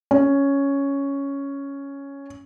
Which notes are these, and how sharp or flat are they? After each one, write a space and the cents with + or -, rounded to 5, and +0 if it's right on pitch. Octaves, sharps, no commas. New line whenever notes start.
C#4 +5